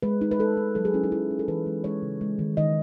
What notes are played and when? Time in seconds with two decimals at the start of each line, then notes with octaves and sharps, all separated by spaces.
0.03 G#3 B4
0.21 D#4
0.31 B4
0.39 G#3 A4
0.57 D#4
0.75 F#3 A4
0.85 G#4
0.94 C#4 E4
1.04 D#4
1.12 F#3 E4
1.31 C#4
1.39 A4
1.48 E3 B4
1.66 G#3
1.84 G#3 C#5
2.02 C#3
2.21 G#3
2.39 D#3
2.57 D#3 D#5